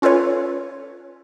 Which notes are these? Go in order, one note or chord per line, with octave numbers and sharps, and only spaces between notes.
C#4 F4 A4 B4 C#5